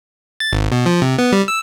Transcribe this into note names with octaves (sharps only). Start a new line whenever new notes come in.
A6
G#1
B2
F3
C3
B3
G3
E6